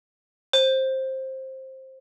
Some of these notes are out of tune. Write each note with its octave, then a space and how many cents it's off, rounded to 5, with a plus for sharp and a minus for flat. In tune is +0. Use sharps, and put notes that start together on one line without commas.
C5 +15